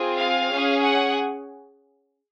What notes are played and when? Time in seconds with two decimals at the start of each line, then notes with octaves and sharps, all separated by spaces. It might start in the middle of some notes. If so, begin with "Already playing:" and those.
Already playing: C4 F4 G#4
0.18 F5
0.51 C#4 G#4
0.84 F#5